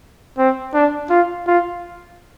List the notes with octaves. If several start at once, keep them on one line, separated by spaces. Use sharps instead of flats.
C4
D4
F4
F4